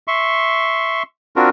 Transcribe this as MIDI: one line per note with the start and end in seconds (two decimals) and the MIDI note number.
0.08 1.03 76
0.08 1.03 84
0.08 1.03 85
1.36 1.50 60
1.36 1.50 62
1.36 1.50 65
1.36 1.50 66
1.36 1.50 70